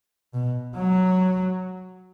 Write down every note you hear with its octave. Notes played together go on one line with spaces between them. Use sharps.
B2
F#3